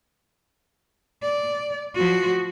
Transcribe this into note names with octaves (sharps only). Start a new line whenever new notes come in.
D5
F3 F#4